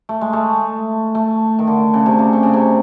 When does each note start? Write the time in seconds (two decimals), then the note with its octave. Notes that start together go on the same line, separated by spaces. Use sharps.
0.09 A3
0.21 G#3
0.33 A3
1.15 A3
1.59 D#3
1.67 D3
1.94 C#3
2.06 C3
2.19 C#3
2.33 C3
2.43 C#3
2.53 C3